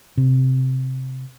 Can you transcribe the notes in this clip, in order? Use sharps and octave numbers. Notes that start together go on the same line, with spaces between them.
C3